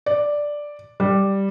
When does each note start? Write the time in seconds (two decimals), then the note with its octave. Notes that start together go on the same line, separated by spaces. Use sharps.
0.06 D5
1.00 G3